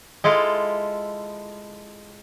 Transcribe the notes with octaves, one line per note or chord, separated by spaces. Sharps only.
G#3 E4 F4 A4